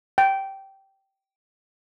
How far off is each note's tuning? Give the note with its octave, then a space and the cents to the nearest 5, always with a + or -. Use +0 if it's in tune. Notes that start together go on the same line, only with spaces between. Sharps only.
G5 -15